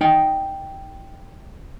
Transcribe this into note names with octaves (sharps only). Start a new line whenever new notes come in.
D#4 G5